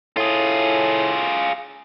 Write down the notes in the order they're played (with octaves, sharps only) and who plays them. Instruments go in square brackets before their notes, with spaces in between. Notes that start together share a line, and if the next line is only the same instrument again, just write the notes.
[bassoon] A2 [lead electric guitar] F4 G#4